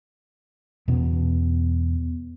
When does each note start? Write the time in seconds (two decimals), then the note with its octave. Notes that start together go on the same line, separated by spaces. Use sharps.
0.88 E2 B2 B3 C#4